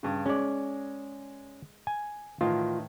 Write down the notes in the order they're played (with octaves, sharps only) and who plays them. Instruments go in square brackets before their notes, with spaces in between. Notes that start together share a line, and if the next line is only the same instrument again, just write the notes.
[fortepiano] G2 C#3
[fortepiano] G#3 [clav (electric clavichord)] C#4 D5
[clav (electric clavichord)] G#5
[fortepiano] A2 D#3 E3 [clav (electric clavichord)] F4